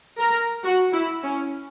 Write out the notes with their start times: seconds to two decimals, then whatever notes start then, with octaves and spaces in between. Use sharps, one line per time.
0.19 A#4
0.63 F#4
0.93 E4
1.23 C#4